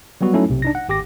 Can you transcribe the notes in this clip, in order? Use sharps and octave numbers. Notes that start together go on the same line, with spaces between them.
F#3 G3 B3 F#4
F#3 A3 C#4 D#4 E4 A4
B1 C3
D4 D#4 A#6
F#5
G#1 G4 D6 A#6